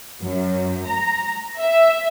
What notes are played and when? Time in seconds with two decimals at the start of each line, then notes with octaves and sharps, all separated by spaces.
0.22 F#2
0.87 A#5
1.59 E5